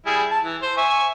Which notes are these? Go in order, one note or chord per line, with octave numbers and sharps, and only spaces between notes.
G3 E4 G#4
A5
E3
C5
E5 G#5 C#6